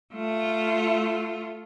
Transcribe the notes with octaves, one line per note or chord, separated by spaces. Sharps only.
A3 F4